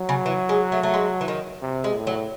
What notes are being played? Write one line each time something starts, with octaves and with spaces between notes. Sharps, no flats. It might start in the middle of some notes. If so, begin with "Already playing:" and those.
Already playing: F#3
C#3
E3
G#3
A3
A3
G#3
E3
D#3
C3
G#3
A2
F#3